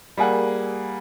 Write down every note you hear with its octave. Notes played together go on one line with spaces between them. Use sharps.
G3 A#3 G#4 F#5